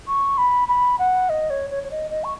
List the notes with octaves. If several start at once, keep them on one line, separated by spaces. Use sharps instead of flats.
C#6
B5
B5
F#5
D#5
C#5
C#5
C#5
D#5
D#5
C#6